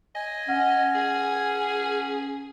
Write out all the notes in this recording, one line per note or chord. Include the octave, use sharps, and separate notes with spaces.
D#5 G#5
C#4 F#5
G#4